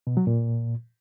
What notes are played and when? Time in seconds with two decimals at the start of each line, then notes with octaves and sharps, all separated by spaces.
0.07 B2
0.17 F#3
0.27 A#2